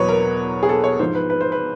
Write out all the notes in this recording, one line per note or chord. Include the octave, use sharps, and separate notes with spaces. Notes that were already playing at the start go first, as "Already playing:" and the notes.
Already playing: E2 B2 F#3 B4 C#5
A#4
G#4
A4
C#5
G#2 F3 C5
B4
B4
C5
B4